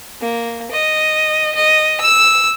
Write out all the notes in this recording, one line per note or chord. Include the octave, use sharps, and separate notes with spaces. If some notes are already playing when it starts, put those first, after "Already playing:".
A#3
D#5
D#5
E6